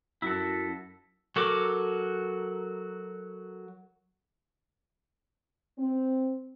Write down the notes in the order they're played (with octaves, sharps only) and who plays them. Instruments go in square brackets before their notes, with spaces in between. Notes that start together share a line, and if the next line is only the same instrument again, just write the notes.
[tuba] F#2 [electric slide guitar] E4 F#4 A4
[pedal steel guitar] F#3 F#4 A4 A#4 D6
[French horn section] C4